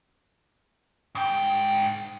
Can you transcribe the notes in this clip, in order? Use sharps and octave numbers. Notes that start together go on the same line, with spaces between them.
G#2 G5